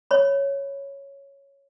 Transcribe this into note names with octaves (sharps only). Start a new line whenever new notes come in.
C#5 B5